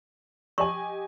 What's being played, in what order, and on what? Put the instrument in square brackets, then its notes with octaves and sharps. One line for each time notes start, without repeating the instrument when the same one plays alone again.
[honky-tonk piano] G4 D#5 G#5 [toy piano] C#6